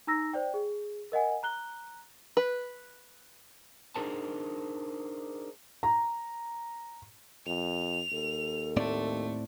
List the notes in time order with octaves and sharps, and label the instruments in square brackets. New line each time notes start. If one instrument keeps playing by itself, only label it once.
[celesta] D#4 A#5 E6 A#6
C5 D5 G5
G#4
A#4 D#5 F#5 G#5
A#5 F#6 G7
[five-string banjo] B4
[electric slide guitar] D4 D#4 G#4 A#4 C5 A5
[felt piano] A#5
[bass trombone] F2 [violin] F7
[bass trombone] D#2 [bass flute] A4
[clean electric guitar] A2 C4 D5 [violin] A3